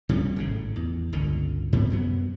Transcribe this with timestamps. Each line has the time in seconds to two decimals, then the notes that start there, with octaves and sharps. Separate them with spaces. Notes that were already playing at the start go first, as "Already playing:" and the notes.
0.09 C3 G3 C4 C#4
0.36 G#1 A2 C#3
0.76 E2
1.13 G1 C#2 D3
1.73 G#2 C3 B3
1.90 F#2 F#3 B3